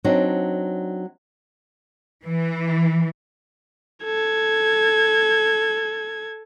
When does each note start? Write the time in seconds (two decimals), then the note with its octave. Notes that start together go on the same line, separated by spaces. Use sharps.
0.04 F#3 C4 D4 D#4
2.24 E3
4.04 A4 G#6